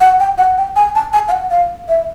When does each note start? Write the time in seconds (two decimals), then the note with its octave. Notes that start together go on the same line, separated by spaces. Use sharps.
0.01 F#5
0.20 G5
0.38 F#5
0.58 G5
0.76 G#5
0.95 A5
1.13 G#5
1.28 F5
1.32 F#5
1.51 F5
1.89 E5